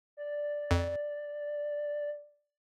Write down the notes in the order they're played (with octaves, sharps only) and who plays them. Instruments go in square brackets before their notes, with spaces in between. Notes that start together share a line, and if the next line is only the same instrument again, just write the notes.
[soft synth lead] D5
[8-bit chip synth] F2